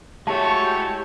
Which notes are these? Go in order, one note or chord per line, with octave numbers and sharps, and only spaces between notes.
G#3 A3 E4 F#4 G4 C#5 F5 A5